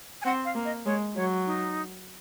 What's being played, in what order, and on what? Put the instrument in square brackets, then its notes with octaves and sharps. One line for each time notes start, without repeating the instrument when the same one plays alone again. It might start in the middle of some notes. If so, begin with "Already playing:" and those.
[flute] G#5
[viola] C4 [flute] F#5
[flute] F5
[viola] A#3
[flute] D#5
[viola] G#3 [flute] C#5
[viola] F#3 [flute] C#5
[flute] D#4